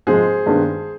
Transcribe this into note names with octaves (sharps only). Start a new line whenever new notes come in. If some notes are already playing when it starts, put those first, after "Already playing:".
G#2 F3 G#3 C4 G#4 C5
G2 D#3 G#3 B3